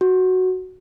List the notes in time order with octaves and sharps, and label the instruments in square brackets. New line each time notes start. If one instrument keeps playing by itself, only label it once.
[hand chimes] F#4